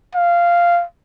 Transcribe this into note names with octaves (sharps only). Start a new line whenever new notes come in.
F5